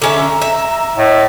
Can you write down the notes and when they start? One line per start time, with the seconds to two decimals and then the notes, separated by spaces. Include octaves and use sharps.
0.02 D3 C#4 E5 A#5
0.42 E5
0.97 A2 D#5